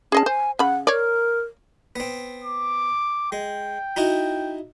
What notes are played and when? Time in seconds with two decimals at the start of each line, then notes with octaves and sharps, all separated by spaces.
0.12 C#4 G#4 D#5 A5
0.26 C5 G#5
0.59 C#3 F#5 B5
0.87 A#4 C#5 D5
1.96 B3 C4
2.44 D6
3.32 G#3 G5
3.96 D#4 E4 F#4